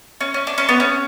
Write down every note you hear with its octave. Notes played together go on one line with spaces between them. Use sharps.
C#4
C#4
D4
C#4
B3
C#4